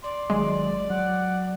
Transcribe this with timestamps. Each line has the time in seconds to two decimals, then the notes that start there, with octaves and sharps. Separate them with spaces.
0.03 D5 C6
0.30 G1 D#3 F#3 G#3
0.90 F#3 F#5